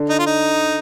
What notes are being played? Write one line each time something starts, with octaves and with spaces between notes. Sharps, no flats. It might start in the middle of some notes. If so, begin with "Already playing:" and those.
Already playing: D3
D#4
F4
D#4